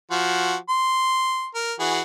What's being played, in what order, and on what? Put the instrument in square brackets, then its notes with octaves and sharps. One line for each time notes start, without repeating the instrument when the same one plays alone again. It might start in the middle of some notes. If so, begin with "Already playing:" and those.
[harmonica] F3 F#4
C6
A#4
E3 F#4 G#4